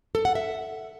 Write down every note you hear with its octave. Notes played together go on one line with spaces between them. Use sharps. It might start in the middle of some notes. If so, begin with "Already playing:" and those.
A4
F#5
E5